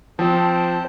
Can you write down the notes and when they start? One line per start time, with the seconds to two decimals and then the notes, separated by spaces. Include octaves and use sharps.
0.19 F3 C4 C5 A5